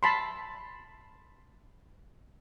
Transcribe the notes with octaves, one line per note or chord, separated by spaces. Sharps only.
A5 B5 C6